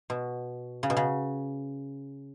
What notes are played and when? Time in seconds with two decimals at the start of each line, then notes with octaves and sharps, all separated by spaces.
0.10 B2
0.83 C#3
0.90 B2
0.97 C#3